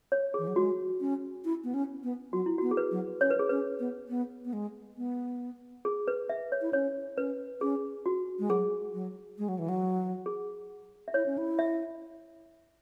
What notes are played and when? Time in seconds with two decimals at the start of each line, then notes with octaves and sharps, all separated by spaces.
0.12 C#5
0.34 E3 G#4
0.47 F#3
0.56 G#3 F#4
1.01 C#4
1.45 E4
1.64 B3
1.74 C#4
2.03 B3
2.33 F#3 F#4
2.46 E4
2.58 B3 F#4
2.71 G#4
2.77 B4
2.92 F#3
3.21 C#4 C#5
3.30 B4
3.39 G#4
3.49 C#4 B4
3.80 B3
4.09 B3
4.45 B3
4.53 G#3
4.97 B3
5.85 G#4
6.08 B4
6.29 E5
6.52 C#5
6.61 E4
6.73 C#4 C#5
7.17 C#4 B4
7.61 C#4 G#4
8.06 F#4
8.39 G#3
8.50 F#3 G#4
8.94 F#3
9.38 G#3
9.48 F#3
9.59 E3
9.69 F#3
10.26 G#4
11.08 E5
11.14 E4 C#5
11.26 C#4
11.38 E4
11.59 E5